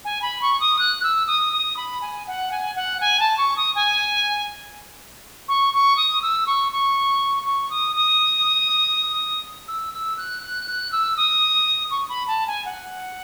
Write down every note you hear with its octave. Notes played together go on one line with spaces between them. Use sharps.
G#5
B5
C#6
D#6
F#6
E6
D#6
D#6
B5
G#5
F#5
G#5
F#5
G#5
A5
C#6
D#6
G#5
C#6
C#6
D#6
E6
C#6
C#6
C#6
D#6
D#6
E6
E6
F#6
F#6
F#6
E6
D#6
C#6
B5
A5
G#5
F#5